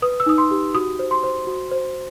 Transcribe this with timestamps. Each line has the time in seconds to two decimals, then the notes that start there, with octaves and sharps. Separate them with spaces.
0.02 B4 D#6
0.20 E6
0.26 D#4 D#6
0.38 C6
0.51 G4
0.75 F#4 D#6
0.99 C5
1.11 C6
1.23 C5
1.47 F#4
1.71 C5